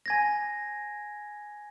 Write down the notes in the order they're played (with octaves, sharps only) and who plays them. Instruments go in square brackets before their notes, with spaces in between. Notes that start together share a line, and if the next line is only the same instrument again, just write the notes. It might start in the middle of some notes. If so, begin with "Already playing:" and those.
[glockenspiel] G#5 G#6 A#6